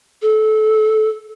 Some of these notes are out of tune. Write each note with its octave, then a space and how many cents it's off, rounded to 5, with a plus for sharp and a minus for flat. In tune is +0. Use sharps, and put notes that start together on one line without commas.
A4 -20